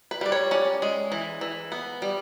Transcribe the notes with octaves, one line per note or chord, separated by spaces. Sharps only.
B4
G3 D5
C#5
C#4 D5
G#3
E3
E3
B3
G3